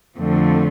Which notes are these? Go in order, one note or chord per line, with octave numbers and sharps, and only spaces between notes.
F2 D3 F3 A3 C4